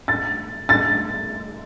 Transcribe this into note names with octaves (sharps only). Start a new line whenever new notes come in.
A6
A6